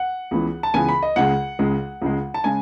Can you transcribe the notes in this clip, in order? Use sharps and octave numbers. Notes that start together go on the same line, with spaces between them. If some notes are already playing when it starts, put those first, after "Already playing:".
Already playing: F#5
C#2 C#3 E3 B3
A5
C#2 C#3 E3 B3 G#5
B5
D#5
C#2 C#3 G#3 F#5
C#2 C#3 G#3
C#2 C#3 G#3
A5
C#3 G#3 G#5